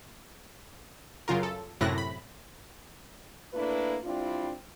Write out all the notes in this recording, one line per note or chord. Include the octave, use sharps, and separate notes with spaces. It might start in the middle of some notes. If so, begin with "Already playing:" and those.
F#2 C#3 F4 A#4
A4
F#2 A2 C3 E4 F#6 A#6
B5
A3 A#3 D4 E4 B4
G3 C4 D4 E4 F4